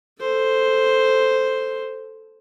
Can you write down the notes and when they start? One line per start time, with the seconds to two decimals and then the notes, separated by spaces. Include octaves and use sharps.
0.20 A4 C5